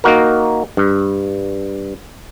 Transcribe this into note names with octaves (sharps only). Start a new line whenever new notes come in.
A#3 D#4 F#4 A#4
G2